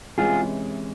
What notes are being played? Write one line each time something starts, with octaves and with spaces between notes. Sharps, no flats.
C3 E3 G#3 C#4 F4 G#4